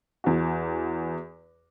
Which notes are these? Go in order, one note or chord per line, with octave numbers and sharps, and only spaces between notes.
E2 F#4